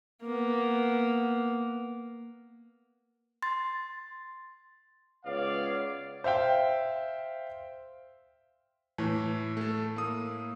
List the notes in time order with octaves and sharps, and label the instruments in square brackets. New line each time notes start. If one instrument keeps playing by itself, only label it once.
[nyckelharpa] A#3 B3
[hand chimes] C6 A6
[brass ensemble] C#2 B3 C#5 D5 F5
[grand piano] C5 E5 F5 G5
[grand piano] A2 [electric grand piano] E3
[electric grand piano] A3 A4
A#3 D#6